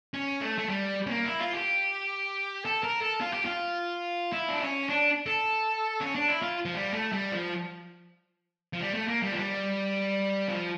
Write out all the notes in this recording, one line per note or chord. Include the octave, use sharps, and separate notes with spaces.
C#4
A3
A3
G3
C#4
A#3
E4
F4
G4
A4
A#4
A4
F4
G4
F4
E4
D4
C#4
D4
A4
C#4
D4
E4
F4
F3
G3
A3
G3
F3
F3
G3
A3
A#3
G3
F3
G3
F3